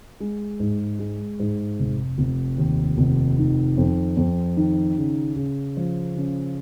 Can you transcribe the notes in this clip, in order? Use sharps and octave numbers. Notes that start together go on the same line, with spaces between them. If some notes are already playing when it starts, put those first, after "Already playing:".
G#3
G#2
G#3
G#2
F1
F1
D#2
F1
D#3
F2
F2
D#3
C#3
C#3
F3
C#3